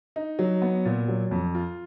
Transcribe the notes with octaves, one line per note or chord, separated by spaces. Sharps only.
D#4
F#3
B3
A#2
F#3
F2
F4